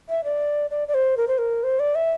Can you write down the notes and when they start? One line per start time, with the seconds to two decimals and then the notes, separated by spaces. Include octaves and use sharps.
0.09 E5
0.24 D5
0.71 D5
0.88 D5
0.94 C5
1.17 A#4
1.28 C5
1.38 A#4
1.64 C5
1.80 D5
1.95 E5